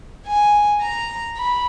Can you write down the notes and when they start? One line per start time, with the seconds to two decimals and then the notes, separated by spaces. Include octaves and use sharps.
0.27 G#5
0.82 A#5
1.37 B5